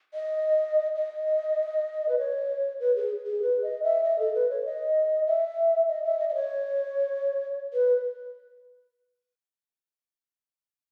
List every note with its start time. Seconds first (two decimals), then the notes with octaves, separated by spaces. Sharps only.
0.14 D#5
0.96 D#5
2.09 B4
2.18 C#5
2.80 B4
2.96 G#4
3.26 G#4
3.42 B4
3.63 D#5
3.83 E5
4.04 D#5
4.19 A4
4.34 B4
4.50 C#5
4.65 D#5
5.27 E5
5.88 D#5
6.04 E5
6.19 D#5
6.29 D#5
6.35 C#5
7.73 B4